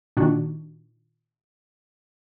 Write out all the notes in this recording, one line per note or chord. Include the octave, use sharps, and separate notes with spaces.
A#2 D#3 D4 F#4